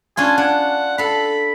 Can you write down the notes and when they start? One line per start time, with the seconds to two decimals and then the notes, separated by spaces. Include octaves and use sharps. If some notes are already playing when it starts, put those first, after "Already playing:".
0.17 C#4 D4 F4 G#5
0.38 D4 F#5
0.98 A4 F5 B5